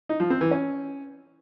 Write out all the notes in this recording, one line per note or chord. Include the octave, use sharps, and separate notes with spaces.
D#4
F3
C4
E3
C#4